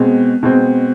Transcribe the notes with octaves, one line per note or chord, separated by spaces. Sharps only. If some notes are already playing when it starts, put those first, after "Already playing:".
Already playing: B2 G#3 C4
B2 G#3 C4